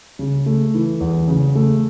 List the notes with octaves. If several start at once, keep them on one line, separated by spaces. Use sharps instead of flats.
C#3
A3
E3
E2
C#3
A3